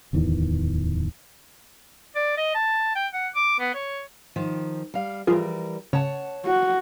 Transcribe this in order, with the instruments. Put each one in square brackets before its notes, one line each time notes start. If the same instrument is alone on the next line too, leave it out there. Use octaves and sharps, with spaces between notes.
[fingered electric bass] D1 E2 D#3 E3
[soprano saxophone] D5
D#5
A5
G5
F#5
D6
B3
C#5
[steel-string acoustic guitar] D#3 F3
G3 F5
[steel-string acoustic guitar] E3 G3 A#4 [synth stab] F3 F4 G#4
[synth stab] C#3 [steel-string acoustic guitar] C#5 F#5 A5
[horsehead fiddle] F#4